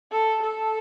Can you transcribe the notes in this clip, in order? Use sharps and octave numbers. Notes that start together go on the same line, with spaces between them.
A4
A4